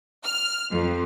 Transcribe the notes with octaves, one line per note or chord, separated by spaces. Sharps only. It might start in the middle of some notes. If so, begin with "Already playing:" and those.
F6
F2